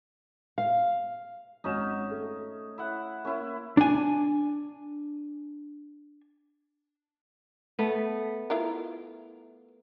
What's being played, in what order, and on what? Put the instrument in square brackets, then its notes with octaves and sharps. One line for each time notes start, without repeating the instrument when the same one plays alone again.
[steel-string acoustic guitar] F5
[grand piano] G#1 F#4 E7 [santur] C#4 D#4
[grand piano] A3
[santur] E4 F#5
[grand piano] A#3 [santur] C#4 E4
[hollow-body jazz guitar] D4 G#5
[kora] A3 B3
[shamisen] E4 F4 A#4